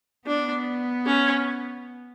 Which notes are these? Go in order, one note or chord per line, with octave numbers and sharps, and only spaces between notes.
B3 D4
C#4